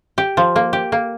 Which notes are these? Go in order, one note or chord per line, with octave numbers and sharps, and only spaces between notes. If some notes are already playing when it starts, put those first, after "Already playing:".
G4
F3
A#3
G4
A#3